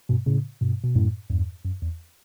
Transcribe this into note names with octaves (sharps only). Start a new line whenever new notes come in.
G2 B2
A2 C#3
G2 B2
B2
F#2 A2
E2 G2
F#2
E2